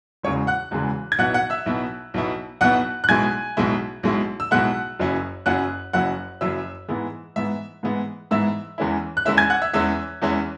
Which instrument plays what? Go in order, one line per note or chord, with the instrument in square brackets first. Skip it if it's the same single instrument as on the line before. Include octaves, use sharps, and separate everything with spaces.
[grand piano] E1 E2 C#3 E3 G#3 C#5 C#6
F#5 F#6
E1 E2 C#3 E3 G#3
G#6
B1 B2 B3 E4 F#5 F#6
F#5 F#6
E5 E6
B1 B2 B3 E4
B1 B2 B3 E4
B1 B2 B3 E4 F#5 F#6
F#6
B1 B2 G#3 E4 G#5 G#6
B1 B2 G#3 E4
B1 B2 G#3 E4
E6
B1 B2 G#3 E4 F#5 F#6
F#1 F#2 F#3 C#4 E4
F#1 F#2 F#3 C#4 E4 F#5 F#6
F#1 F#2 F#3 C#4 E4 F#5 F#6
F#1 F#2 F#3 C#4 E4 E5 E6
G#2 E3 G#3 B3 E4
G#2 E3 G#3 B3 E4 E5
G#2 E3 G#3 B3 E4
G#2 E3 G#3 B3 E4 E5 E6
E2 E3 G#3 C#4 E4
F#6
E2 E3 G#3 C#4 E4 E5 E6
G#5 G#6
F#5 F#6
E5 E6
E2 E3 G#3 C#4 E4 E5 E6
E2 E3 G#3 C#4 E4